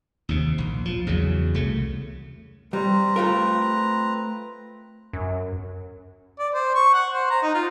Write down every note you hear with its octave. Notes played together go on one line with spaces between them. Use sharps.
D#2 C3
A#1
F3
E2 C#3 F#3
C2 C#3 A3
G3 C4 B4 A#5
A3 F4 A#4
F#2
D5
C5
C#6
F#5
C5
A#5
D#4
F4